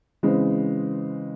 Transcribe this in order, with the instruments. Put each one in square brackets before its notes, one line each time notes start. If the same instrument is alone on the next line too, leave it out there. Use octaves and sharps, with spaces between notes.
[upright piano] C#3 E3 G#3 C4